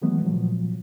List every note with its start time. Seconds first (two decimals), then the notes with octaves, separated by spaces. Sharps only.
0.02 D#3 E3 F#3 G#3 A3 B3
0.25 A#2 F3 F#3